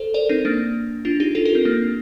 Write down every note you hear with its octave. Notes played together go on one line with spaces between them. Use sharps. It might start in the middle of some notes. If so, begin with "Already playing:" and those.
Already playing: A4 C5
A#4 D5
C4 D#4
A#3 D4
D4 F4
D#4 G4
F4 A4
G4 A#4
C4
A#3 D4